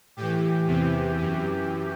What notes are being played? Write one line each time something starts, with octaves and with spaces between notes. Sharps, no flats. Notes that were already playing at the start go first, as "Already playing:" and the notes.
A2 E3 G4
E2 C3 E3
F#2 E3